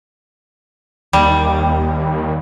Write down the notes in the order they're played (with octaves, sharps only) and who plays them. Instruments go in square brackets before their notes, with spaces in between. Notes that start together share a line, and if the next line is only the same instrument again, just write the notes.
[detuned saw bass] D#2 [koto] G3